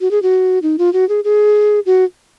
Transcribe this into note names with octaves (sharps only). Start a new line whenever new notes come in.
F#4
G#4
F#4
D#4
F4
F#4
G#4
G#4
F#4